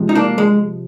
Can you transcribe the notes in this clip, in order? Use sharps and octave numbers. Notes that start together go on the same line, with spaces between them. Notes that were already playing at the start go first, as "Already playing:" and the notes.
Already playing: C3 F3 G#3
D#4
A#3 D4
G#3